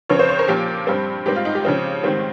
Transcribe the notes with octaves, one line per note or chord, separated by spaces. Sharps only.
C#3 F3 C4 C#5
C5
C#5
A#4
A#2 F3 A#3 G4
G2 G3 C4
G#2 G3 C4 G4
F4
D#4
G4
C#3 F3 C4
G#2 D#3 G3 C4